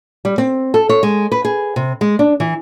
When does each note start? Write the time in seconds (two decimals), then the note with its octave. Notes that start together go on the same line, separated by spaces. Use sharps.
0.25 G3
0.38 C4
0.74 A4
0.89 C#5
1.03 G#3
1.32 B4
1.45 G#4
1.76 C3
2.01 G#3
2.19 D4
2.40 E3